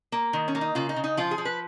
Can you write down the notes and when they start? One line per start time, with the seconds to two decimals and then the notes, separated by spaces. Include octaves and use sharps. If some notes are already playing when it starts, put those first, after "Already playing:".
0.12 A#3
0.33 D#3
0.48 C#4
0.55 A#3
0.61 D#4
0.75 C#3 F4
0.89 D#4
0.96 C#3
1.04 D#4
1.17 F3 F4
1.31 G#4
1.38 F3
1.45 B4